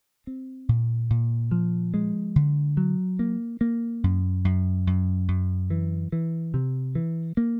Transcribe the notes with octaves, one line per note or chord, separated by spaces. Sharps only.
C4
A#2
A#2
F3
G#3
D3
F#3
A#3
A#3
F#2
F#2
F#2
F#2
E3
E3
C3
E3
A#3